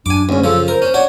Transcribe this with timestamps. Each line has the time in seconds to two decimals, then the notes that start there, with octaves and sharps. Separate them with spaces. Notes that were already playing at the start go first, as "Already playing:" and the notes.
0.06 F#2 D4 G#5 D6
0.29 D2 G#2 C#4
0.44 C#3 F3 A4
0.68 A#4 C5
0.82 C#4
0.94 D4 F#4 C#5